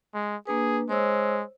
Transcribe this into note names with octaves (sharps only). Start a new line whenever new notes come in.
G#3
A#3 D4 G#4 B4
G#3 C5 C#5 E6